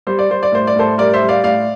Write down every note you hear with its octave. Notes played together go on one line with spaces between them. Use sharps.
G3 C5
D5
G3 C5
D5
A2 C5
D5
A2 A4 C5
G3 A#4 D5
C5 E5
G3
D5 F5
A2 D5 F5